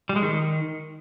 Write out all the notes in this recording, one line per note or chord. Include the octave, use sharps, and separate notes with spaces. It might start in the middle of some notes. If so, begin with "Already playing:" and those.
G3
G#3
D#3